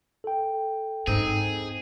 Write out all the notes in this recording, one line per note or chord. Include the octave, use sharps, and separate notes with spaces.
A4 G5
G#2 C4 D#4 G#4